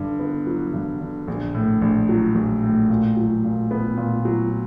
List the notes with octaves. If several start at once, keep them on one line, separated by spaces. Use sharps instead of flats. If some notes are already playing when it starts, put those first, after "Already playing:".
Already playing: G2 D3
B3
F#3
G2
D3
A#1
A2
A#1
F#3
A#1
A2
A#2
F#3
A#2
B3
A#2
F#3